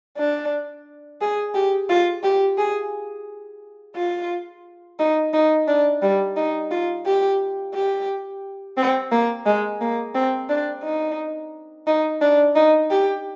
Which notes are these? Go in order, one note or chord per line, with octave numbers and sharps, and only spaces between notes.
D4
G#4
G4
F4
G4
G#4
F4
D#4
D#4
D4
G3
D#4
F4
G4
G4
C4
A#3
G#3
A#3
C4
D4
D#4
D#4
D4
D#4
G4